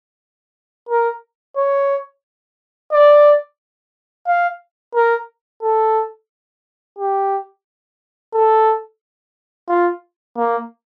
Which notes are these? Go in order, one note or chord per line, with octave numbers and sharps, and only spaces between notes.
A#4
C#5
D5
F5
A#4
A4
G4
A4
F4
A#3